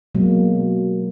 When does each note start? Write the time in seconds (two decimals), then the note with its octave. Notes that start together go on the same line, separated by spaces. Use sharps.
0.15 B2 F#3 G#3 A#3